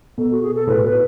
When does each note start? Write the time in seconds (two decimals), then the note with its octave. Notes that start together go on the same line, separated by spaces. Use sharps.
0.18 B2 A4
0.31 F#4
0.43 G#4
0.55 A4
0.68 A2 B4
0.84 B2 B4